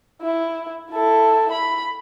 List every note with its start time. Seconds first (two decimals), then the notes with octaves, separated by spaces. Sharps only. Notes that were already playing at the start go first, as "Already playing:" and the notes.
0.22 E4
0.92 E4 A4
1.52 B5